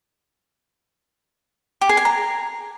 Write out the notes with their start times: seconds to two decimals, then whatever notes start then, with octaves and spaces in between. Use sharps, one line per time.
1.81 G4
1.89 G#4
1.97 G#5
2.05 A#5